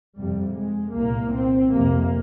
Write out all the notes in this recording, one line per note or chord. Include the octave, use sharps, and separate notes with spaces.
F2 C3 G3
G#3
C2 A#2 A#3
C4
F2 C3 A#3